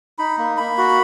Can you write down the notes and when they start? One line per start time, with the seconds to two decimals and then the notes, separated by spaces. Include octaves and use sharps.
0.18 D#4 B5
0.38 A#3
0.57 A#3 B5
0.78 F#4